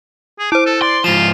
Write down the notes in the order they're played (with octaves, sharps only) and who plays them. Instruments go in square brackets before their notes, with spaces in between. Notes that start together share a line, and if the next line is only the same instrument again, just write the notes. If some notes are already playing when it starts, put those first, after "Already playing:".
[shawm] G#4
[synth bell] E4 C5 [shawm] D6
[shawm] A4
[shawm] D5 [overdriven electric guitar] C6
[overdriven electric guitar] G#2 F3 [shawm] F4 [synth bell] E7